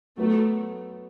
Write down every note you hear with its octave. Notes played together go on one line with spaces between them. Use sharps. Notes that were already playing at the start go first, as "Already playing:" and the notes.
F#3 A3 B3 F#4